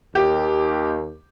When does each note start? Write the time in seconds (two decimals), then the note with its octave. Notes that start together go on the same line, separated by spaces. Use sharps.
0.15 D#2 G4